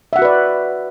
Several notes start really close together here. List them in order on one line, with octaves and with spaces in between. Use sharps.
E5 F#5 F#4 B4 D5